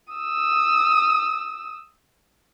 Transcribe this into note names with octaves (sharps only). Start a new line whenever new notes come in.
D#6 E6